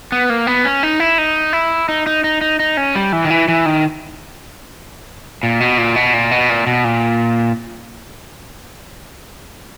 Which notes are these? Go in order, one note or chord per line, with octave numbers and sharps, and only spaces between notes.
B3
A#3
B3
C#4
D#4
E4
D#4
E4
D#4
D#4
D#4
D#4
D#4
C#4
G3
E3
D#3
E3
E3
D#3
A#2
B2
A#2
B2
A#2
B2
A#2
B2
A#2